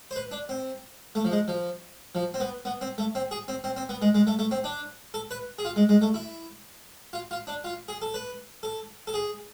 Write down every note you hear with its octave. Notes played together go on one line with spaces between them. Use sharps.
C5
B4
D4
C4
A3
F3
G#3
F3
F3
C4
B3
B3
C4
A3
C4
G#4
C4
C4
C4
B3
G#3
G#3
A3
A3
C4
D4
A4
B4
G#4
F4
G#3
G#3
A3
E4
F4
F4
D4
F4
G#4
A4
B4
A4
A4
G#4